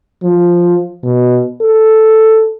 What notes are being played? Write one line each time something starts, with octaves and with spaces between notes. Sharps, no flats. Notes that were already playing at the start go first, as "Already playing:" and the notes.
F3
B2
A4